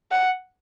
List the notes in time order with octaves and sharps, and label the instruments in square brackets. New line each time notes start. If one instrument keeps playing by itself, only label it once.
[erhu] F#5